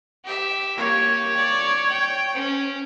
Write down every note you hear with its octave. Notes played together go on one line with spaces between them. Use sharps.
G4 E5
A#3 G4 C#5
D5
G5
C#4